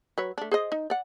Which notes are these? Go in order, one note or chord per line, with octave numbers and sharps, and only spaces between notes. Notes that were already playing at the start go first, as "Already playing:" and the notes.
F#3 B4 C#5
A3 D4
G#4 C5 D#5
D#4
D5 F#5